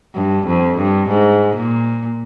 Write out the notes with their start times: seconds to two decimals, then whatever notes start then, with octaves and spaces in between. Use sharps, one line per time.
0.15 G2
0.47 F2
0.78 G2
1.09 G#2
1.56 A#2